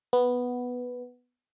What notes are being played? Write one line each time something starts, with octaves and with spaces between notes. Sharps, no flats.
B3